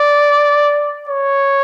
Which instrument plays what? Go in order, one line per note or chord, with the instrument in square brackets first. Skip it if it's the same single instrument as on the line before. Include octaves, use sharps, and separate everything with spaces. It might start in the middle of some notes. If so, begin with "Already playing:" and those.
Already playing: [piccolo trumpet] D5
C#5